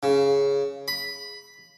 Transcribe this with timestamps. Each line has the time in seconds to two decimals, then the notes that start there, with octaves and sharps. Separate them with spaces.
0.03 C#3
0.88 B5